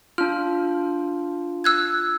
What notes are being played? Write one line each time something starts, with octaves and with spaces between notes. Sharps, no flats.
D4 F4 F6
E6 F#6 G#6